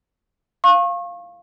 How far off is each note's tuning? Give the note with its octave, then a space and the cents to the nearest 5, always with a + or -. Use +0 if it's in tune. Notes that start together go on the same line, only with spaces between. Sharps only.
F5 +0 C#6 -35